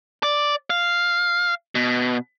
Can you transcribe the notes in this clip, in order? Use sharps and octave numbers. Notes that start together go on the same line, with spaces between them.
D5
F5
B2